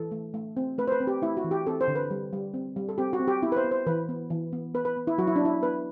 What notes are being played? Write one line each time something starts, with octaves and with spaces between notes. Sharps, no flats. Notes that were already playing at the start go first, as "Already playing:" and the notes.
Already playing: E3 A4
A3
A3
C4
A3 B4
C5
B4
C4
G4
A3 E4
F#4
E3
G4
C4 A4
C5
D3
B4
G3
G3
C4
G3
A4
C4 G4
F#4
C4
G4
B3 E4
B4
C5
B3
C5
E3 B4
B3
E3
B3
B3 B4
B4
B3
E4
F#3 F#4
E4
D4
B3 E4
B3 B4